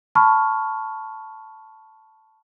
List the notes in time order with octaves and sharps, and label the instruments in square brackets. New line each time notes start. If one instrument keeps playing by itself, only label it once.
[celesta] A5 B5 C#6 F6